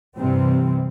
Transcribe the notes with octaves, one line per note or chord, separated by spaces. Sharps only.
G2 C3 E3 G3 C4